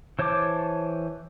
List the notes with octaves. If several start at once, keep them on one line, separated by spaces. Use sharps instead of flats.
E3 C5 C#5 A5 D6